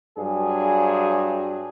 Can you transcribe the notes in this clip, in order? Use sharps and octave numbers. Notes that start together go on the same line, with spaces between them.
G2 F#3 G#4